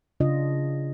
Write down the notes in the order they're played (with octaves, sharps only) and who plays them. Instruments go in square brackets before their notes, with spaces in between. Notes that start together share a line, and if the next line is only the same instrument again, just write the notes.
[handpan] C#3 D4 F4 D#5